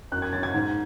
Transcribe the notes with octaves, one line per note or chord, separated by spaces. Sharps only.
F#2 F#6
G#6
C#4 A6
G#6
G#2